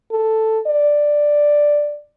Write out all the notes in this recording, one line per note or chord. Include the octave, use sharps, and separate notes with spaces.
A4
D5